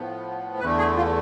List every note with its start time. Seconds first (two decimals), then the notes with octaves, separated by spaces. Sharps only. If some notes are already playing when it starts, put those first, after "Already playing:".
Already playing: A2 F3 B3
0.59 E2 D3 A3 B4
0.78 G#4
0.96 F4